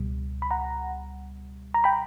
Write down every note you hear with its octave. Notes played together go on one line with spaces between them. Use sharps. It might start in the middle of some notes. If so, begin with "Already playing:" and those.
Already playing: C#2 B2 G3
B5
F#5 A#5
A#5
G5 B5